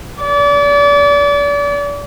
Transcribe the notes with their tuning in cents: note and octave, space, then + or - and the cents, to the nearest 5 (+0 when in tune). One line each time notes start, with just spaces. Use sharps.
D5 -35